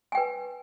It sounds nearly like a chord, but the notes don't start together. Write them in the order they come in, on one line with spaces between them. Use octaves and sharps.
G#5 G5 B4